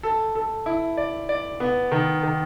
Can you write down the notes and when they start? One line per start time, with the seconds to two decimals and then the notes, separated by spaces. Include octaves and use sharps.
0.03 A4
0.35 A4
0.66 E4
0.97 D5
1.29 D5
1.60 B3
1.92 D#3
2.23 D#3